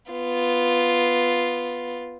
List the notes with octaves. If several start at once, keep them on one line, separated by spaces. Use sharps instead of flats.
B3 F4